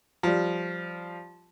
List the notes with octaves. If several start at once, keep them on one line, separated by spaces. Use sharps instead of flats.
F3 G3